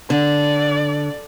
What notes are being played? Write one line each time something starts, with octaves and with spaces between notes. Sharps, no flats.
D3 D5